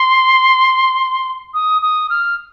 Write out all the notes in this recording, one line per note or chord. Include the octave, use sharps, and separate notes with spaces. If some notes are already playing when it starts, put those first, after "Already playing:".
Already playing: C6
D#6
D#6
F6